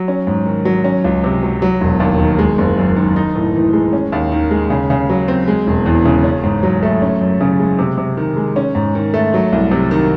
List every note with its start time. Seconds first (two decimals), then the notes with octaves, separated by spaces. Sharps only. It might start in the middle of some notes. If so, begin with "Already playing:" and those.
Already playing: F#3
0.08 C#4
0.27 G#2
0.46 D#3
0.65 F#3
0.84 C#4
1.04 C#2
1.24 C3
1.43 F#3
1.62 F#3
1.81 E1
2.00 D#2
2.19 D#3
2.39 G#3
2.58 F#1
2.78 F#2
2.96 D#3
3.16 D#4
3.35 A2
3.55 E3
3.73 G#3
3.93 C#4
4.12 D#2
4.32 D#3
4.51 G#3
4.70 C#3
4.90 C#3
5.10 F#3
5.28 C4
5.48 G#3
5.67 E1
5.86 E2
6.05 C#3
6.24 C#4
6.44 G#2
6.63 F#3
6.83 A3
7.02 C#4
7.21 F#2
7.41 C#3
7.59 G#3
7.79 C3
7.98 C3
8.17 D#3
8.37 G#3
8.56 C#4
8.75 G#2
8.95 D#3
9.14 A3
9.34 F#3
9.52 C2
9.71 C3
9.91 D#3